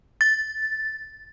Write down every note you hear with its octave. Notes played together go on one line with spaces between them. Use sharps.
A6